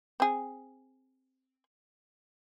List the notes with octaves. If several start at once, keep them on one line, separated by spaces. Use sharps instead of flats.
C4 G#4